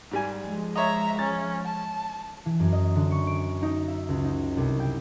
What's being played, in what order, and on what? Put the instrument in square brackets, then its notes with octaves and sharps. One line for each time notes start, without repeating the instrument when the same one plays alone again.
[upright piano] G#2 G3 G#5
[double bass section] F3 G#3
[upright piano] C#5 D#5 [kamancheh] E5 A#5
[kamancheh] C#4 [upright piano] A6
[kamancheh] A5
[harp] E3
F#2
D#5
D3
C#6
D7
D#4
E5
C#2
D#4
C2
G5